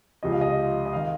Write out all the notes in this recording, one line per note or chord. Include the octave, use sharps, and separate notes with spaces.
C#2 C3 F3 D#5
F5
D#5
D#5
D#3 F5